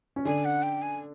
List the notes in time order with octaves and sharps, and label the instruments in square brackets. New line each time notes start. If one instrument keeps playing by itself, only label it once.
[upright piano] C#4
[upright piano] D3 D4 [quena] G#5
[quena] F#5
G5
G#5